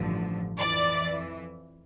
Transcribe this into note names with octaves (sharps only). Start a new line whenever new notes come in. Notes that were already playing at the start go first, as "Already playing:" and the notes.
Already playing: A1 G2 D3 F3
F2 E3 D5